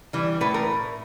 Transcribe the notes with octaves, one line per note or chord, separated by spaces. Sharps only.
E3 G3
A2 B4
A#4